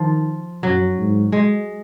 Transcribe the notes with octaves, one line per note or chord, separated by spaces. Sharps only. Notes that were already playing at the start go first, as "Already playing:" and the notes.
Already playing: D#3 F3
F#2 F#3
G#2
G#3